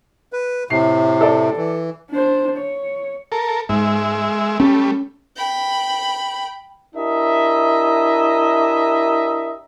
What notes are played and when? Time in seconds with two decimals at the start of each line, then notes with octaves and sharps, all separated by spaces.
0.33 B4
0.70 A2 C3 C7
1.21 A4 D5
1.57 E3
2.10 D4 C5
2.58 C#5
3.32 A4 A#4
3.69 G#2 G#3 E5
4.60 G3 A3 C#4
5.36 G5 B5
6.95 D4 E4 G4 A#4 D#5 E5